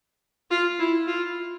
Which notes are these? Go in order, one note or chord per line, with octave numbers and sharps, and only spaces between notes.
F4
E4
F4